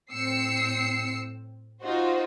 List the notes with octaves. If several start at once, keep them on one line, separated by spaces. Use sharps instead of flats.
A2 C4 E6 C7 C#7
D#4 F4 F#4 C5